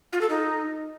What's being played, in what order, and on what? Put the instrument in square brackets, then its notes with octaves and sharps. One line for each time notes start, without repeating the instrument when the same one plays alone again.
[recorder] F4
A4
D#4